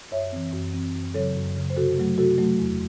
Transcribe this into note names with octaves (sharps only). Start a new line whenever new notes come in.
F#2 C#5 E5
E3 C4
F#2
E3 C4
F#2
C#3 F#3 A4 C#5
F#2
C#3 F#3
C5
C3 F#4 A4
F#3 A3
C3 F#4 A4
F#3 A3
E2